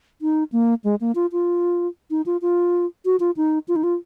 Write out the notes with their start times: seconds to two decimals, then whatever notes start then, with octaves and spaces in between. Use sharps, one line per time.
0.22 D#4
0.52 A#3
0.84 G#3
1.01 A#3
1.15 F4
1.32 F4
2.11 D#4
2.26 F4
2.42 F4
3.05 F#4
3.20 F4
3.37 D#4
3.68 F4
3.76 D#4
3.83 F4